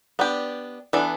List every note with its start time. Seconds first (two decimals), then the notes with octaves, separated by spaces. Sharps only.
0.19 B3 D4 G4
0.93 E3 B3 D4 A4